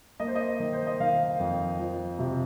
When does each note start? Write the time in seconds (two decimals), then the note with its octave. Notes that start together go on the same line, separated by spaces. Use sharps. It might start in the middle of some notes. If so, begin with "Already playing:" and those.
0.20 A#3 D#5
0.27 C5
0.35 D#5
0.60 D#3
0.73 C5
0.87 D#5
1.00 D#3 F5
1.39 F2
1.79 F3
2.19 C3